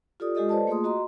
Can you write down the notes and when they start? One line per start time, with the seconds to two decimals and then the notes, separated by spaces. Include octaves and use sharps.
0.20 F4 G4 A4 D5 D#6
0.35 G#3 F4 G4 A4 D#5 D#6
0.49 A4 B4 C5 D5 D#5 A5
0.67 A3 A#3 F4 G#4 C6 D#6
0.84 F#4 D#5 A#5 C6